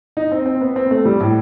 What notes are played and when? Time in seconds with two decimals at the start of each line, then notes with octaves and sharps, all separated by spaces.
0.17 D#4
0.32 C4
0.46 C4
0.61 B3
0.76 C4
0.91 A3
1.05 G3
1.20 A2